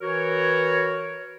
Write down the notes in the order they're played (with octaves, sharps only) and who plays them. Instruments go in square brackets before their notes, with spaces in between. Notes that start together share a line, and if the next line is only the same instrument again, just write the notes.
[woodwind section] E3 F#4 A#4 C#5